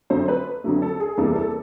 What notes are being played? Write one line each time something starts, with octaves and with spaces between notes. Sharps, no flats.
F2 D3 F#3 A3 C5
B4
F2 D3 F#3 A3
A4
G#4
E2 C3 E3 G3 A#3 A4
A4